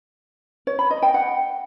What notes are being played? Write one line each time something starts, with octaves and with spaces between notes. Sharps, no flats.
C#5
B5
D#5
G5
F#5